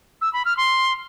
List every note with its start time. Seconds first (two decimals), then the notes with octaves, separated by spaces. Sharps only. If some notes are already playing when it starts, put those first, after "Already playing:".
0.21 E6
0.33 B5
0.45 F6
0.57 C6